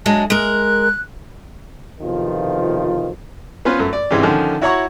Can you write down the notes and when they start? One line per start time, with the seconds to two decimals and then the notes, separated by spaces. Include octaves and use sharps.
0.06 F#3 G#3 D4 A5
0.30 G#3 A#4 F#6
2.01 B1 E2 C3 D#3 F3 F4
3.65 B3 C#4 F4 B4 C5
3.79 F#2 A3
3.93 D5
4.11 G#2 C3 E3 G#3 C#4 G4
4.23 D3 D#3 F3 C#4
4.62 E4 F#4 C#5 F#5 A#5 C#6